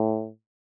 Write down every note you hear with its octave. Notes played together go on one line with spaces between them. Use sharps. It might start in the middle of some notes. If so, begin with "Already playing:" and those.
Already playing: A2